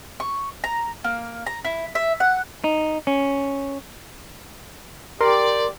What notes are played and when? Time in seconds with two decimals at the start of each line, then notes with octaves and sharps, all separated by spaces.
0.20 C#6
0.64 A#5
1.04 A#3
1.46 A#5
1.65 E4
1.95 E5
2.20 F#5
2.64 D#4
3.07 C#4
5.21 G4 A#4 D5 C6